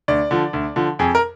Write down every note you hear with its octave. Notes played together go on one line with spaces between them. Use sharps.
D2 D5
D3 F3
D2
D3 F3
F2 G#4
A#4